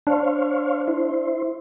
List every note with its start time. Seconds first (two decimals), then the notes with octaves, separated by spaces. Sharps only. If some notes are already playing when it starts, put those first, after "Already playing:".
0.07 D4 C5 C#5 F5
0.88 E4 C5